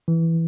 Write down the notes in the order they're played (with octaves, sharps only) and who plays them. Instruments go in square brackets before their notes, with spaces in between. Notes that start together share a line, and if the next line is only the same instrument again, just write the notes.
[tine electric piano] E3